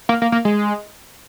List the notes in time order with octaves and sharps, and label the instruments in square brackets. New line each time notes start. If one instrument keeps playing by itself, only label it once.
[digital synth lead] A#3
A#3
A#3
G#3